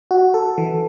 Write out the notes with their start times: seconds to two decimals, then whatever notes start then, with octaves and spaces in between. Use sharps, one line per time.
0.11 F#4
0.34 A4
0.58 E3